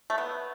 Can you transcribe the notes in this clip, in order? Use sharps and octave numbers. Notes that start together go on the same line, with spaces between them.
A3
B3